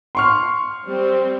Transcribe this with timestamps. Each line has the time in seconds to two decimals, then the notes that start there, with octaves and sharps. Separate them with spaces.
0.15 C6 C#6 F6
0.86 G3 C4